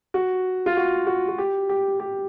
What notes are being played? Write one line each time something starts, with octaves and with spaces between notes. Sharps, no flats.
F#4
F4
F#4
F#4
F#4
G4
G4
G4